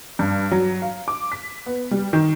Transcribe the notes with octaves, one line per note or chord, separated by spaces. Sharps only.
G2
F#3
F5
D6
B6
B3
G3
D#3